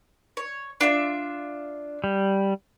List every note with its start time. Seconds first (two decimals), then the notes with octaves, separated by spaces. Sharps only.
0.37 C#5
0.81 D4 F4 E5
2.04 G3